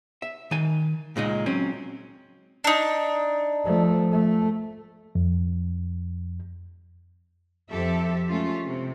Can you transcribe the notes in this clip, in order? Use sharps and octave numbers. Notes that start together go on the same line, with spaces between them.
E5
D#3 G#5
C#2 A#2 G#3 D#4
F#3 C4 C#4
D4 D#4
F3 A3
A3
F2
F2 F3 C4 G4 A4 E5
F#3 G#3 A3 C#4 F4
C3